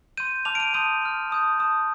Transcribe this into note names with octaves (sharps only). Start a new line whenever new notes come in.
C6 G6 D#7
A5 D6 F6 F7
D7
D#7
A5 C6 D#6 G6 D#7
C6 F6
A5 D#6 G6
A5 D#6 G6